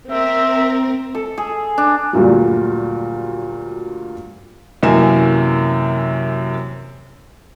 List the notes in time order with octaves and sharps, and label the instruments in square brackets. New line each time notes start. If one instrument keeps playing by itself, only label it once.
[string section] C4 A#4 [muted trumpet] E5
[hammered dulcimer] A4
G#4
D4
[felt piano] D2 G2 A#2 F#3
F#2 C3 E3 A#3 G#5 E7